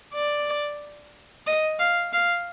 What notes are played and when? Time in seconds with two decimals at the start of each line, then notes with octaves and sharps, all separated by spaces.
0.14 D5
1.47 D#5
1.79 F5
2.13 F5